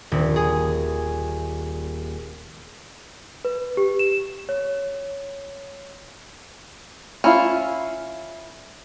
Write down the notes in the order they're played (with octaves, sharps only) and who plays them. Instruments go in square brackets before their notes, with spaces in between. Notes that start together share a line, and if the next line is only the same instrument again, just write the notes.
[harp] D#1
G#4
[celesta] B4
G4
E7
C#5
[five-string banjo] C#4 E4 F4